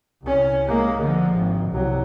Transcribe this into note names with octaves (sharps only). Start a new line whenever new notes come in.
C2 C#4
G#3 A#3
D3 F3
G#1
C2 F#3